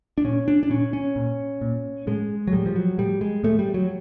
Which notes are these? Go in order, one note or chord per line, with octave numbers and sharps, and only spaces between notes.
D4
A#2 C#4
D4
D4
A#2 C#4
C#4
A#2
A#2
A2 G#3
F#3
A2 G3
F3
F#3
A2 G3
G#3
A2 A3
G3
F#3